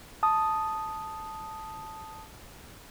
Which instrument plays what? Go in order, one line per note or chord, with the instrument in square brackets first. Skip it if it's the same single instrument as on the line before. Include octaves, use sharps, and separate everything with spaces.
[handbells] A5 D#6